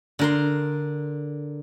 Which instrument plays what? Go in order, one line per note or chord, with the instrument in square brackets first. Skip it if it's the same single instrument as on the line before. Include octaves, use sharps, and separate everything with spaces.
[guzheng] D3 A#4 C6